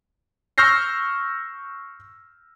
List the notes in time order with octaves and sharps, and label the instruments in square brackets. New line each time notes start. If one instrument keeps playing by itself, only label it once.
[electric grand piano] C#6 E6 F6 G6 A#6 C7